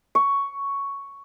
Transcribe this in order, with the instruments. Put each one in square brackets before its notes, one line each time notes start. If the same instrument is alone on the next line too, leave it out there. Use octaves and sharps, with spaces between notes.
[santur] C#6